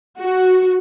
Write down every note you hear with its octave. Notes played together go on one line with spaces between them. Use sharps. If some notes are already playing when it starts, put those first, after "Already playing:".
F#4